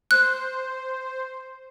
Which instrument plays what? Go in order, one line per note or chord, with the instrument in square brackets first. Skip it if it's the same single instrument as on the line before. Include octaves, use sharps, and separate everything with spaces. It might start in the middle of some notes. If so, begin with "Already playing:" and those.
[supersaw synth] C5 [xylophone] F#6